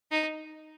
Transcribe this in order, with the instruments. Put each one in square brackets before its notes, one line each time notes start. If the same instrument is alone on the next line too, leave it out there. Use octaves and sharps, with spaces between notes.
[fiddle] D#4